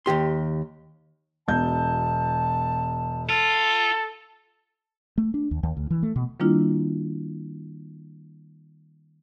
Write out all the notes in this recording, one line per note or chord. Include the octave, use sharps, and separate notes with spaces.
D#2 B2 G4 C6
E1 B2 A5 G6
F4 A4
A3
D4
D#2
D#2
D2
E3
A3
B2
D#3 G3 A#3 D4 E4 F4